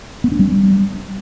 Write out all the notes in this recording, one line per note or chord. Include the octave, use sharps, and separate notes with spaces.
B3
D4
G3